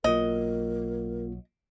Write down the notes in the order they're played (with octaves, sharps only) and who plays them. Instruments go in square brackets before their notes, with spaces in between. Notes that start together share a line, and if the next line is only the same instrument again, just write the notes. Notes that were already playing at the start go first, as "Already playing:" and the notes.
[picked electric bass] B1 F#3 [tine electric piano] A#3 F4 [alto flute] A#4 [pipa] D#5